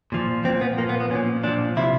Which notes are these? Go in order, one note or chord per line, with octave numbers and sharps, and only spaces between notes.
A#2 F3
A#2 F3 C4
B3
A#2 F3 A#3
B3
B3
A#2 F3 C#4
A#2 F3 D4
C3 F3 E4